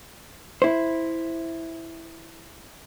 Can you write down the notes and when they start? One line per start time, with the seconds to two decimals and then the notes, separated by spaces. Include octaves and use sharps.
0.62 E4 C5